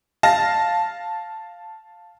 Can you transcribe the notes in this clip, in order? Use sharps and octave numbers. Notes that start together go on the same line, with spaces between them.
F5 A5 A#6